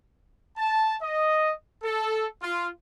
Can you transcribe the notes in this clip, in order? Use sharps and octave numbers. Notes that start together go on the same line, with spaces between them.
A5
D#5
A4
F4